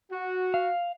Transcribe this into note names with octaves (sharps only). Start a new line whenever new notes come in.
F#4
F5